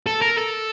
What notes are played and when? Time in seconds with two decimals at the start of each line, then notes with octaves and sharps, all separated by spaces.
0.06 A4
0.22 A#4
0.38 A4